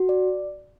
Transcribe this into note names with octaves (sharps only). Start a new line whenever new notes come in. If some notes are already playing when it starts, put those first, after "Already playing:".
Already playing: F#4
D5